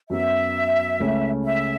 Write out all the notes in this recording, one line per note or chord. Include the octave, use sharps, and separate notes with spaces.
F#2 F#3 B3 F#4 E5
C#2 C#3 A3 C#4
E5